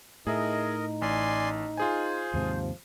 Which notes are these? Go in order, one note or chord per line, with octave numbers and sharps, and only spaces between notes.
A2 D#4 G#4 A#4 D#5 E5
A1 D5 G#5 C6
F4 G#4 C5 G#5
D#2 G#2 C3 F3